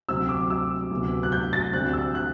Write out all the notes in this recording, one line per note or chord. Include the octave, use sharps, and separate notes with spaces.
D2 C3 F#3 C4 E6
D6
E6
D2 C3 F#3 B3
F#6
G6
A6
D2 D3 G3 C4 F#6
E6
F#6